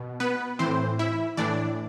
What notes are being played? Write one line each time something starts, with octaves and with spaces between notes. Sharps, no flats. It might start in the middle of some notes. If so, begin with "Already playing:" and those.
Already playing: B2
B3 B4
A2 E3 C4 C5
E4 E5
A2 E3 D4 D5